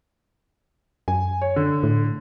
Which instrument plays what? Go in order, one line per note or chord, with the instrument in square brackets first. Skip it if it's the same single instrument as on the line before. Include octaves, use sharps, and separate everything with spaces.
[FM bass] F#2 [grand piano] G#5
[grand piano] C#5
D3
[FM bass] A2